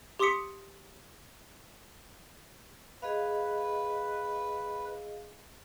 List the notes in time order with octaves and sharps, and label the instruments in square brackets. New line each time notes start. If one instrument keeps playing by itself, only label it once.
[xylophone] G4 C6 D6 D#6 B6 C#7
[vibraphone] G#4 D#5 F5 [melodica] B4